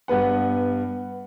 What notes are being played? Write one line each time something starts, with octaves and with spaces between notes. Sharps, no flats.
G2 B3 B4 F#5